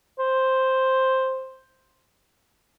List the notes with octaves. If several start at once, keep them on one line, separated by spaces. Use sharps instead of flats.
C5